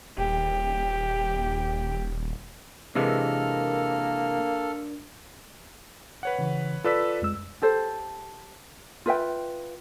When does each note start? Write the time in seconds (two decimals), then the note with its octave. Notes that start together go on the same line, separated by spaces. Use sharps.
0.18 D#1 G4
2.95 C3 E3 G#3 A#3 D4 A4 A#4 F6
6.23 B4 C#5 F#5
6.39 C#3 E3
6.84 F4 A4 B4 D5 E6 B6
7.22 F2 G#3 E6
7.62 G4 A4 C5
9.06 F4 B4 E5 G5